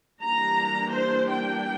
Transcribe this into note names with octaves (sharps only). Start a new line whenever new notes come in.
E3 G3 A#3 D4 A#5
C5
G5